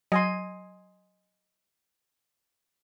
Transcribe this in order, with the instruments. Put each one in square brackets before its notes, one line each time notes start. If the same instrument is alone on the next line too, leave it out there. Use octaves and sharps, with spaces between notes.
[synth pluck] F#3 [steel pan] D#5 G#5 C6